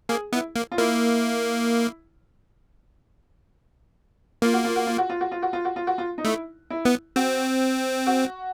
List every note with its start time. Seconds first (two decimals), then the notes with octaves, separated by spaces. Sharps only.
0.09 A#3 G#4
0.33 B3 E4
0.56 A#3
0.72 F4
0.78 A#3 E4
4.42 A#3 F4
4.53 F#4
4.65 F4
4.76 F#4
4.87 F4
4.98 F#4
5.10 F4
5.21 F#4
5.31 F4
5.42 F#4
5.53 F4
5.65 F#4
5.76 F4
5.87 F#4
5.98 F4
6.18 D#4
6.25 A3 E4
6.70 E4
6.85 B3
7.16 C4 F#4
8.07 F#4